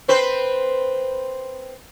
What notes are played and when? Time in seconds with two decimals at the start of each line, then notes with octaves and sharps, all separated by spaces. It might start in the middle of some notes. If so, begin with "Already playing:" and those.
0.08 C4 B4 C5